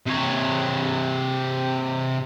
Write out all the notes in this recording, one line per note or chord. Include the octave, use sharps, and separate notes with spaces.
C3 C#5